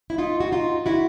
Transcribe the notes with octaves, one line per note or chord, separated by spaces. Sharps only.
E4
D#4 F4
F#4
D#4 F4
E4 F#4